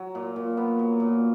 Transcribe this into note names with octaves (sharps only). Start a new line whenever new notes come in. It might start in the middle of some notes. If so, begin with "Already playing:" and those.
Already playing: F#3
A#2
A#2
B3
F#3
A#2